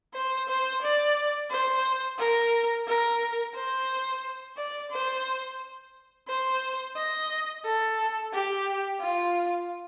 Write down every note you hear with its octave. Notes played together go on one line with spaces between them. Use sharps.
C5
C5
D5
C5
A#4
A#4
C5
D5
C5
C5
D#5
A4
G4
F4